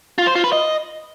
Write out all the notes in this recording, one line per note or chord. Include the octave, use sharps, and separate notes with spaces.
F4
C5
F4
B4
D#5